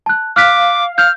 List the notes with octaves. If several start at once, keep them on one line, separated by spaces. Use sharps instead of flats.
A5 F#6
F5 D6 F6 F#6 B6
F6 G6